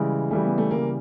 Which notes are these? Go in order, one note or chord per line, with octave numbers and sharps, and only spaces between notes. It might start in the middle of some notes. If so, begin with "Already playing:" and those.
Already playing: C#3 E3 G3 G#3
C#3 E3 G3 A3
B3
A3
C#3 E3 G3 A#3